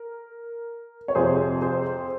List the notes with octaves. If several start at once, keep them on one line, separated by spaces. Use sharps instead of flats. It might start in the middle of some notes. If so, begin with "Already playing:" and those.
Already playing: A#4
C#5
F2 C3 F3 G#4 C5
G#4 C5